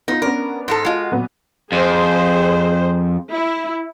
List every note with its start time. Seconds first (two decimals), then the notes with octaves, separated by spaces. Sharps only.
0.08 B3 D#4 F4
0.22 B3 C#4 D4 A#4
0.68 G#2 G#3 A4
0.85 G#3 F4 F#4 D#5
1.12 A#2 F#3 B3
1.72 F2 G#4 C5
3.32 E4